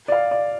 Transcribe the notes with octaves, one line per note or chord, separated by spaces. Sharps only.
D5
F5
D5